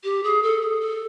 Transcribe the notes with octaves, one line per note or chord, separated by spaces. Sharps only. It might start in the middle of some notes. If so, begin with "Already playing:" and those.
G4
G#4
A4
G#4
A4